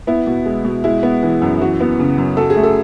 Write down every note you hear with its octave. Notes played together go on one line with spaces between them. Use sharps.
B3 E4
B2
G#3
B2
G#3 E4
B3
E3
F#2
E3 F#4
B3
C#3
F#2
F#3 A4
G#4
A3
A4